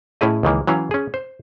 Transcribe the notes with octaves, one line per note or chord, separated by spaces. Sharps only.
A2 C#4 E4 G#4 D#5
C#2 D#3 E3 A#3
E3 F#3 C#4 F5
C#4 G#4
C5